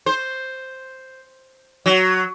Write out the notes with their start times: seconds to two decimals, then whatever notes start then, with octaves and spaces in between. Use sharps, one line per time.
0.06 C5
1.86 F#3